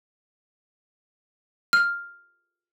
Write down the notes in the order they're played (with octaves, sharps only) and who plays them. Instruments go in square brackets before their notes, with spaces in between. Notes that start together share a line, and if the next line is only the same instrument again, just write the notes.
[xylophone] F6